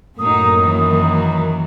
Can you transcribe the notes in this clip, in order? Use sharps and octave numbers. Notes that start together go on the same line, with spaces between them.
F#2 A2 F#3 A#3 D#4 D#6
D#3 E3 F#3